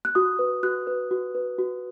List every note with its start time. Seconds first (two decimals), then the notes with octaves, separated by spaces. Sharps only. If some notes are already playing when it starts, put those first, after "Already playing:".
0.05 F#6
0.15 F#4 D#6
0.39 B4
0.63 F#4 F#6
0.87 B4
1.11 F#4
1.35 B4
1.59 F#4